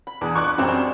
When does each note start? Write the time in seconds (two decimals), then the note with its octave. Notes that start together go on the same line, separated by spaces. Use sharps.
0.07 B5
0.21 E2 D4 G#4
0.36 D4 F4 C#6 D6 F#6
0.58 F#2 G3 G#3 C4 F#4